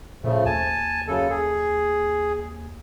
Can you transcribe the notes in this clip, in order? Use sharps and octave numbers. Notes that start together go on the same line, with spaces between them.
A#2 C#3 F3 A3
D#2 G#5 A5
F#2 C#3 A4
G#4